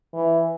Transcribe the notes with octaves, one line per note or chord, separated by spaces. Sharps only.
E3